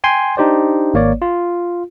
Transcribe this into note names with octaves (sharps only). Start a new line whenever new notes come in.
G5 G#5 C6
D4 D#4 G4 C5 D5
G#1 A#3 C#5 D5
F4